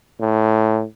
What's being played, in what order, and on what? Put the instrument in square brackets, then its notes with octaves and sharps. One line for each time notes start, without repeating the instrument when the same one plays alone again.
[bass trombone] A2